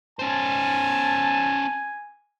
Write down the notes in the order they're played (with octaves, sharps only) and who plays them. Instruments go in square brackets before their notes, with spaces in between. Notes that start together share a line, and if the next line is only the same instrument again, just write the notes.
[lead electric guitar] C#4 C5 [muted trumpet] G#5 [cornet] A5